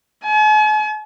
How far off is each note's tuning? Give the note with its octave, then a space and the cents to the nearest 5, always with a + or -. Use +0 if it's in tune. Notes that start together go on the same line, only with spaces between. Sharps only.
G#5 +45